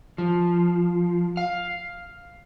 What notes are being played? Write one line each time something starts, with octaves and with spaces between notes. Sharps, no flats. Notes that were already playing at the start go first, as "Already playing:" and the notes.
F3
F5